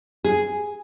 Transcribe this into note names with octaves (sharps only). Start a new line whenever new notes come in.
G#4